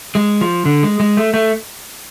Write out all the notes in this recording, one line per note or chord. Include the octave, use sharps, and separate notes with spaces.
G#3
F3
D3
G#3
G#3
A3
A3